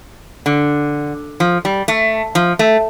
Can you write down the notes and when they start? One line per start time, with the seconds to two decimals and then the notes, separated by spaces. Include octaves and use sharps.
0.46 D3
1.40 F3
1.65 G3
1.88 A3
2.35 F3
2.59 A3